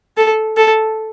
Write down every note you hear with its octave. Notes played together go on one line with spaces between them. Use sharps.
A4
A4